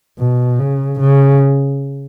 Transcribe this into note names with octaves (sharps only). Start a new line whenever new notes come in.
B2
C#3
C#3